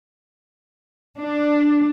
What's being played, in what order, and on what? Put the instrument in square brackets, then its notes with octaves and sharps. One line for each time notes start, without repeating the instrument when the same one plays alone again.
[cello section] D4